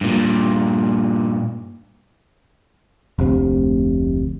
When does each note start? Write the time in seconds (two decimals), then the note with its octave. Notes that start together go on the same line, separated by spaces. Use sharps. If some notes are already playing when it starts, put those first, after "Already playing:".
0.01 G2 A#2
3.19 F1 D2 C3